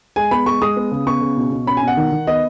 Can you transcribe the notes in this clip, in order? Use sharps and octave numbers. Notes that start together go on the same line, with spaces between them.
G#3 G#5
B3 B5
G#3 C#6
G#3 D#6
B3
C#3
B3 C#6
C#3
B2
B2
C#4 B5
G#5
B2 F#5
D#3
D#3
B3 D#5